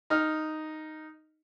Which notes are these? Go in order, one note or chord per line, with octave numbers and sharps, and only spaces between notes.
D#4 F6